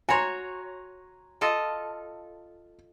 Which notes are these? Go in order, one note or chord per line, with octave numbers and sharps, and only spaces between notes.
F#4 C#5 G#5 A#5 C6
F4 A4 D#5